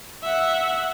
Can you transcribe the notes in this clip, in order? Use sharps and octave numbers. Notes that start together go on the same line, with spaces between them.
E5 F#5